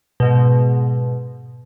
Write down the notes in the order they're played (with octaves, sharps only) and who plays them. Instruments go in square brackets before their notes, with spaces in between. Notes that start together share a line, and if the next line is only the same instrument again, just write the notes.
[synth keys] G#2 B2